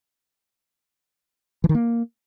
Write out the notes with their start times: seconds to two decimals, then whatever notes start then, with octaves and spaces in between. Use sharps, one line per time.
1.64 E3
1.69 D#3
1.75 A#3